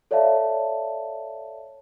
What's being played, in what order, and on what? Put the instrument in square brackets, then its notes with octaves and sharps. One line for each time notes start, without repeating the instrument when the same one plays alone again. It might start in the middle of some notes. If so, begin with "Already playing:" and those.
[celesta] A4 C#5 D5 E5 F5 A5